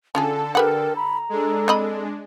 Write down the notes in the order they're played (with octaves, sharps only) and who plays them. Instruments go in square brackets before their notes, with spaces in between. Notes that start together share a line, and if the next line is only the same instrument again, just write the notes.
[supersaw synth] D3 A4 [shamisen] C#4 F4 G#4 [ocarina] A5
[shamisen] G4 B4 F#5 [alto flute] A#4 [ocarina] G5
[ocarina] A#5 [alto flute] B5
[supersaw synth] G#3 D4 [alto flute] A4
[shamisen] C4 D#5 B5